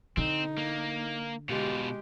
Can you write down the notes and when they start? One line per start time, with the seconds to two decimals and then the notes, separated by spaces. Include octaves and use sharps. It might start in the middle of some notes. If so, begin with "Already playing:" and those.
0.17 D3 C4 D#4
0.58 A#3
1.49 B2 G#3 F4 G4